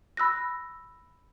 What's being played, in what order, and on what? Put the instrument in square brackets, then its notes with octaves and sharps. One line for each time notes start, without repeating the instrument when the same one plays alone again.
[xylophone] B5 E6 F#6 A#6